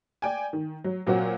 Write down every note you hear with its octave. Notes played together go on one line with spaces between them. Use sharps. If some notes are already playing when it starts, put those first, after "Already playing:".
D5 G5 G#5
D#3
F#3
A#2 F#3 A#3 C4 F#4